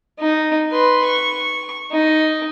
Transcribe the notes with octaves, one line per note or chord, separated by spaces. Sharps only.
D#4
B4 C6
C#6
D#4